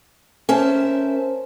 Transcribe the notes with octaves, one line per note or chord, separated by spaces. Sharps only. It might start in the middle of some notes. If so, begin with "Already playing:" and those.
C#4 A#4 C5 E5 A5